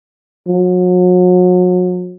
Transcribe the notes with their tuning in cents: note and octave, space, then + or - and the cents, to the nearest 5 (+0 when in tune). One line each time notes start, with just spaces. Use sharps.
F#3 -35